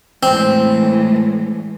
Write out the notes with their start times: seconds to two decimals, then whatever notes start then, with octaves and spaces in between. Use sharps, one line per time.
0.23 A2 E3 G#3 C4